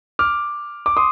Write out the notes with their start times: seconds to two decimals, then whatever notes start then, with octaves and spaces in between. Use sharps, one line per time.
0.19 D6 F6
0.86 D6
0.97 C6 D#6